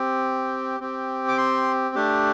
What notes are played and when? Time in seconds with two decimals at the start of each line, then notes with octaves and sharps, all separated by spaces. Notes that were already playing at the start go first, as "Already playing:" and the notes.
Already playing: C4 G4
0.80 C4 G4
1.28 D6
1.38 C6
1.95 A3 D4 G4